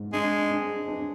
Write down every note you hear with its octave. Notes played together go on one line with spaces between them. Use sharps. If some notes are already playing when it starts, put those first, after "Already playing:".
Already playing: G#2
G#3 D4
D4
D4